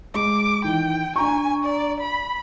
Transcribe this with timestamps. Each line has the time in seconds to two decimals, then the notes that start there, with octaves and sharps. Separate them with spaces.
0.14 G#3 D6
0.64 D#3 E3 G5
1.16 D4 G#5 A#5 C#6
1.64 D5
2.00 B5